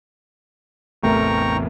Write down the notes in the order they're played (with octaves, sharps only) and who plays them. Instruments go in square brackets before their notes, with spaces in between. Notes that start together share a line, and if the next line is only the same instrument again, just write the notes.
[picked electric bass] A1 E2 C3 [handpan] A3 A#4 [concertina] G5 A#5 C#6